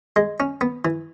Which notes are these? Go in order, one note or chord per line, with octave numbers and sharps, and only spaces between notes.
G#3
C#4
B3
E3